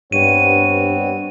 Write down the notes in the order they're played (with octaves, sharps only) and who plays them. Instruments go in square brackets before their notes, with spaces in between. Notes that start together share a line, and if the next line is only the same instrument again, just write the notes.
[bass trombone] G2 [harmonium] B3 C4 C#5 [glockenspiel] D#7